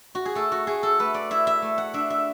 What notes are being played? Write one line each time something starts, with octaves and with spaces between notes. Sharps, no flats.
F#4
G#4
A3 A4
F#4
A3 G#4
A4
A3 B4
D5
E4 E5
E5
A3
F#5
D4 E5
E5